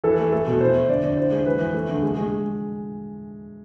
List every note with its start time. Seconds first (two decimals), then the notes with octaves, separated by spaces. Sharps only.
0.04 E3 A4
0.18 A3
0.32 A3 A4
0.47 B2
0.61 E4 C5
0.75 E4
0.89 D3 D5
1.03 D3
1.17 E4 C5
1.32 G#3
1.46 E3 B4
1.60 E3
1.74 A3
1.89 D3
2.03 G#3
2.17 G#3